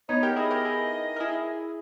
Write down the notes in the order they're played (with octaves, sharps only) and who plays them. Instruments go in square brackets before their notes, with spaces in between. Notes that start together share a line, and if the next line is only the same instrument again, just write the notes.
[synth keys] B3 D#4 [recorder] C#5
[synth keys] G4 A#4
[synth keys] E4 G#4 [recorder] D#5
[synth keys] G4 A#4
E4 G#4
A#4
E4 G#4